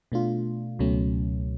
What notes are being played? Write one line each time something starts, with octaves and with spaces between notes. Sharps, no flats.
B2 A3 D4 F4
C#2 B2 F#3 A3 C#4